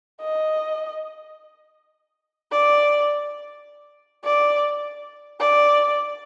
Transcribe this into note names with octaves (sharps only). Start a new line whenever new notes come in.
D#5
D5
D5
D5